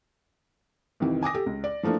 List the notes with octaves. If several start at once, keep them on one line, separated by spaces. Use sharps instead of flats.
C2 F2 D#3 E3
G#5 D6 D#6 A#6
G4 A4
C#2
D5
E3 F3 A3 A#3 D4